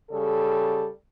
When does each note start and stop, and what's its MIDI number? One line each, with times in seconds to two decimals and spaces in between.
0.10 0.88 49
0.10 0.88 55
0.10 0.88 69